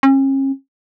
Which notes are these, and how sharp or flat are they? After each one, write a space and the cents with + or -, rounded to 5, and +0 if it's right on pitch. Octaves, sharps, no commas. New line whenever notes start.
C#4 -40